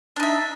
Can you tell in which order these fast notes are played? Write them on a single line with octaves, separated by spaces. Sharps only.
D4 D#4 E5